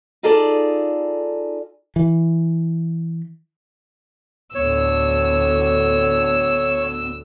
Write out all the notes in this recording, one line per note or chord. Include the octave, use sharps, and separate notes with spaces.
D#4 F4 G#4 A4 D5
E3
D2 A2 D3 B3 C#5 E6